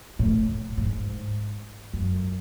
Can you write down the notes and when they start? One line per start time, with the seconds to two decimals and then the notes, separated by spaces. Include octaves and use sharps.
0.19 A2
0.77 G#2
1.93 F#2